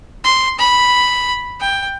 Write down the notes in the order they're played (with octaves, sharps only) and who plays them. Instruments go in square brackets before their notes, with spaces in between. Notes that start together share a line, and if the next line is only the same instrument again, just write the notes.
[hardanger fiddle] C6
B5
G5